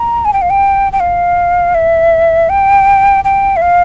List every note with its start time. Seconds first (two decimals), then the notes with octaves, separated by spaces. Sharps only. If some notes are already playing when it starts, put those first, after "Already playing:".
Already playing: A#5
0.25 G#5
0.33 G5
0.42 F5
0.50 G5
0.93 G5
1.00 F5
1.75 E5
2.49 G5
3.24 G5
3.56 E5
3.62 F5